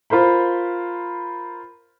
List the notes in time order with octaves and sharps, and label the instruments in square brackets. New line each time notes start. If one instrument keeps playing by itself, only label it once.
[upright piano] F4 A#4 C5 B5